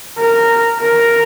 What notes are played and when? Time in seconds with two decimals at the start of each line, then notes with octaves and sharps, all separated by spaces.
0.18 A#4
0.80 A#4